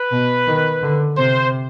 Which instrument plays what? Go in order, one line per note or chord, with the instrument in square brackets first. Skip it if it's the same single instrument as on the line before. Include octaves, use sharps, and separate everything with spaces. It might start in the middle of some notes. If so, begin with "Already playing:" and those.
Already playing: [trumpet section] B4
[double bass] B2
D#3
D3
[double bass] C3 [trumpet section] C5